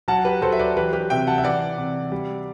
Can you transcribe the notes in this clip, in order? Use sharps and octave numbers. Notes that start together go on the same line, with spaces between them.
F#3 F#5 A5
G4 B4
F#3 A4 C5
E5
B4 D5
E3 G4 B4
G4 B4
C3 E5 G5
F#5 A5
E5
E3 D5 F#5
C3
G3